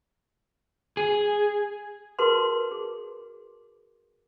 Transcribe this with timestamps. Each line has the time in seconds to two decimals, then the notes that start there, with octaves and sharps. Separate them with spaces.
0.97 G#4
2.19 F#4 G#4 A#4 B4 A5 C6
2.72 G#4